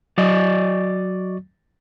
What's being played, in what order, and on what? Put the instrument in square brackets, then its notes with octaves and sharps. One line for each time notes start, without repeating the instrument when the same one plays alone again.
[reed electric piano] F#3 [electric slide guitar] F#4 D5 D#5